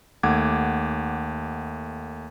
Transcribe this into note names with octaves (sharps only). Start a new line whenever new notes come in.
D#2 A3 F#5 D6 G#6